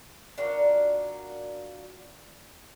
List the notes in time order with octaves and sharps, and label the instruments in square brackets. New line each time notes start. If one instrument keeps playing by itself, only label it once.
[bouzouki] D4 F4 F#4 A#4